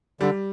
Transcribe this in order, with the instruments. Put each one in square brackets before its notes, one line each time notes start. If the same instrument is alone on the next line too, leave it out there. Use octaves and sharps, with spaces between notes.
[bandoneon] D3 [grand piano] G3